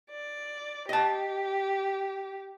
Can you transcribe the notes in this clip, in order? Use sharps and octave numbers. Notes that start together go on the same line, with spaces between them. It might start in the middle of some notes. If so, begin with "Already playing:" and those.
D5
G4 D#5 A5